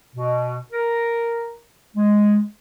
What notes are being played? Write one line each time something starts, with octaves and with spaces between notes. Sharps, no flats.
B2
A#4
G#3